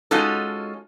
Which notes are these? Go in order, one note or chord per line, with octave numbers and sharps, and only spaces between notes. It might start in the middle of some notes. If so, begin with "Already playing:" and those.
G#3 C#4 D#4 F4 F#4 A4